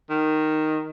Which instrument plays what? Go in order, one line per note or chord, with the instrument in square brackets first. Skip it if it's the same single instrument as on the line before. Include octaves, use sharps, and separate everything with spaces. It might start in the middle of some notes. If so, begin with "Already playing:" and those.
[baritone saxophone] D#3